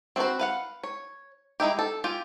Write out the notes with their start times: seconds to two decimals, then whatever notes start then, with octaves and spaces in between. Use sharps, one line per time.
0.16 C4 F#4 G#4 B4 C5
0.39 B4 F5 F#5
0.83 C#5
1.60 G#3 D#4 E4 G4
1.79 A4
2.04 F4 G4 G#5